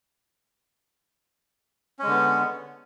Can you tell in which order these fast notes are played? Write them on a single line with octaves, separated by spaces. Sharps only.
C#4 G#3 D3 B3